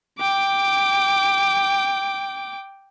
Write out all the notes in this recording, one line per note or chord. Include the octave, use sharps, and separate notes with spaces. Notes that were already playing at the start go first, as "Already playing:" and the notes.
G5 D6